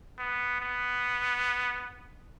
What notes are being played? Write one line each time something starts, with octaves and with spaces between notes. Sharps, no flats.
B3
B3